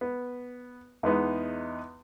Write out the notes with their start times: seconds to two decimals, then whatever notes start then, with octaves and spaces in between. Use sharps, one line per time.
0.01 B3
1.03 E2 G#3 B3 D#4